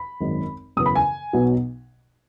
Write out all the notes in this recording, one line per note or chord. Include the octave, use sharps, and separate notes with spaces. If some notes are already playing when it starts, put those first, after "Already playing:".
Already playing: B5
G#1 F#2 D#3 G#3
F#2 C#3 E3 B3 D#6
B5
G#5
B1 B2 F#3 B3